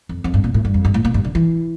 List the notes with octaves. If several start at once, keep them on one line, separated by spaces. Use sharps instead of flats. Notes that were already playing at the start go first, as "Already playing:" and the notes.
F2
F2
G2
A#2
A2
G2
F2
G2
A2
A#2
G2
D3
E3